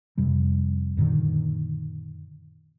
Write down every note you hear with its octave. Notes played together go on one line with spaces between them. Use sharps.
F2 C3 G3
F#2 A#2 D3 D#3